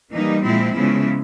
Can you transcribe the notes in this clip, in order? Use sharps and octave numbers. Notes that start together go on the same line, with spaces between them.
E3 G3 A#3 D#4
A#2 F3 G#3 C4 E4
C#3 F3 G#3 B3 E4